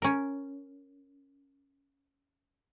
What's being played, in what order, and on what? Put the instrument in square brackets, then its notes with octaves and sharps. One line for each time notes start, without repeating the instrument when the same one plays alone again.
[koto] C#4 A#4